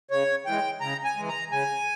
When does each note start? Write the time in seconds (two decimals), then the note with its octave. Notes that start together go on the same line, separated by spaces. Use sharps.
0.11 C#3 C#5
0.46 E3 G#3 G5
0.81 C#3 A#5
1.05 G#5
1.17 E3 G#3
1.28 A#5
1.51 C#3 G#5